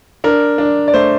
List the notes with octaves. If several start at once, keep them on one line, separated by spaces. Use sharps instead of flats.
D4 A#4
D4
D5
A3 C5